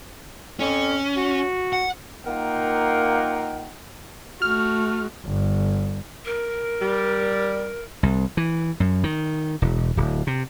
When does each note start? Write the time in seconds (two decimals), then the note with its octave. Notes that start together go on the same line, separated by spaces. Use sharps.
0.60 F2 C#4
1.17 F#4
1.73 F#5
2.26 A#3 D#4 F4 A#4 F#5 G5
4.42 A3 F#4 F6
5.26 G1
6.25 A#4
6.81 G3
8.03 C2
8.37 E3
8.80 F#2
9.04 D#3
9.62 E1
9.97 D1
10.27 C3